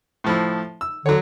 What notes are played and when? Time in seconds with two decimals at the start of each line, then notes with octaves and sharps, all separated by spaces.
0.24 A2 F3 E4
0.81 E6
1.06 D3 F#3 C#5